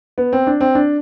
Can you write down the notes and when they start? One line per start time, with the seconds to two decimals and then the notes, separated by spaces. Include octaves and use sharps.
0.18 B3
0.33 C4
0.47 D4
0.61 C4
0.75 D4